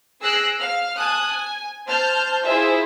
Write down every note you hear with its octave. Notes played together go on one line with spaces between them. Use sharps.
G#4 E6 F#6 A#6 C7 D7
F5 F6
G#5 A5 D#6 F#6
G#5
C5 A5 F6 G6
E4 F4 G#4 C5 E5